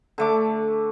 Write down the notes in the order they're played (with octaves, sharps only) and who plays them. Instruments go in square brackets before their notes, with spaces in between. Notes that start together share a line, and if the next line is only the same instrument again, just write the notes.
[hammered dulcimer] D3 A3 D6